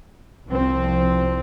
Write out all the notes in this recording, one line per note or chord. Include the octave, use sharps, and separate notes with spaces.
C2 F3 C4